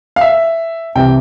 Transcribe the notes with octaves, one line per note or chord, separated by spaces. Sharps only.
F5
E5
C2 C3 E3 G5